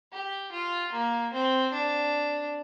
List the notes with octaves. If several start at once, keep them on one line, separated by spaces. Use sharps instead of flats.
G4
F4
A#3
C4
D4